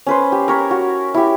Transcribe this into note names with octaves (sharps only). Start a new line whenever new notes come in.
C#4 B4 C5
G4
A#4 C#5 B5
F#4
E4 G4